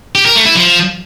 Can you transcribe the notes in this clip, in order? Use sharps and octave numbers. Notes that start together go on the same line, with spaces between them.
G4
A#4
A3
E4
F3